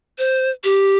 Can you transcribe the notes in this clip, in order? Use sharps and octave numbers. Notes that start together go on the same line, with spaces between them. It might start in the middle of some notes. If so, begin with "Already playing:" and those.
C5
G4